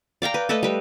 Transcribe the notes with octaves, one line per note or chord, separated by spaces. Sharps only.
D5 F5 G5 A#5
B4
A3 A4 B4 D#5
G3 B4